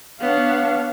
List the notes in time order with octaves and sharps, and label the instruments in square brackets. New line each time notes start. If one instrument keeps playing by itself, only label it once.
[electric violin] B3 D4 [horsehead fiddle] C#5 F5